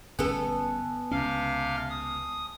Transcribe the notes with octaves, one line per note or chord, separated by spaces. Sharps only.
G1 A#2 B3 C#4 A4 G#5 A5
C#2 C3 C#4 F5 F6
D#6